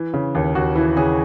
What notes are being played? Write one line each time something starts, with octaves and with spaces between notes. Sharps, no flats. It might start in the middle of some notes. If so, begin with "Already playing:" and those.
Already playing: E3
C#3
D#2
D#2 F#4
E3 E4
C#3 G#4